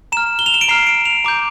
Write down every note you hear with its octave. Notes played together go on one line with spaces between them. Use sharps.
A#5 F6 E7
G7
F7
E7
D7
A#5 F6 C7
D7
F7
A#5 D6 G6